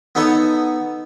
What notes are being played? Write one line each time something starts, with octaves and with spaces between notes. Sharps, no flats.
B3 D#4 A4 C#5